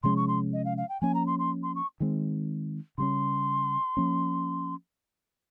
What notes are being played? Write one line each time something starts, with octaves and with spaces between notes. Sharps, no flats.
C3 F3 G#3 C#4 C6
C#6
C6
D#5
F5
F5
G5
F3 A#3 C#4 G#5
A#5
C6
C6
C6
C#6
D#3 G#3 C4
C#3 G3 C#4 C6
F3 A#3 C#4